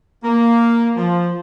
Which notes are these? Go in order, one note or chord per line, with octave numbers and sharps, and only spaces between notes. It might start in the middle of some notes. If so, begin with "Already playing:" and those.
A#3
F3